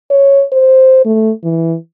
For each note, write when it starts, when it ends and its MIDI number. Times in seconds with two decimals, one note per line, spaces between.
0.10 0.44 73
0.52 1.02 72
1.05 1.31 57
1.43 1.76 52